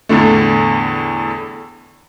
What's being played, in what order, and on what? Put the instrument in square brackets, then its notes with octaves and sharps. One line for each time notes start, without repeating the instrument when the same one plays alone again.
[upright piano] E2 A2 D3 A3